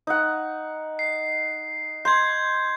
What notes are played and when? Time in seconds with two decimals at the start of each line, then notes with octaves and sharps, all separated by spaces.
0.07 D#4 F#5
0.99 C7
2.05 C6 G6 G#6